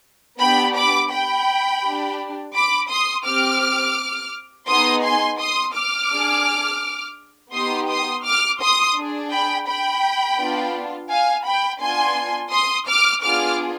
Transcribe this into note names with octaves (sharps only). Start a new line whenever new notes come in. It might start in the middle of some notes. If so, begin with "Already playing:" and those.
B3 D4 G4 G5 B5
B5 D6
G5 B5
D4 G4
B5 D6
C6 D#6
C4 G4 D6 F6
B3 D#4 G#4 C6 D#6
G#5 C6
C6 D#6
D6 F6
D4 G#4
B3 D#4 G4 C6 D#6
C6 D#6
D6 F6
C6 D#6
D4 G#4
G5 B5
G5 B5
B3 D4 F4
F5 G#5
G5 B5
B3 D4 F4 G#5 C6
C6 D#6
D6 F6
B3 D4 F4 G#4 D6 F6